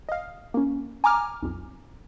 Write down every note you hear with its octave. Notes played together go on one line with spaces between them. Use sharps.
D#5 F5
A#3 C#4
G#5 A#5 D6 F6
B1 F2